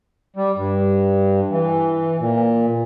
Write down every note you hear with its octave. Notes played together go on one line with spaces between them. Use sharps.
G3
G2
E3
A#2